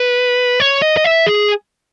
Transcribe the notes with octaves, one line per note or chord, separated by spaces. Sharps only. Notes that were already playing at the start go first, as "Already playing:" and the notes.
Already playing: B4
C#5
D#5
D#5
E5
G#4